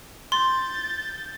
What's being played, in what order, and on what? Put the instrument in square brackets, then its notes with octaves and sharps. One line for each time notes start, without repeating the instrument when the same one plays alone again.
[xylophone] C6 [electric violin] G6 A6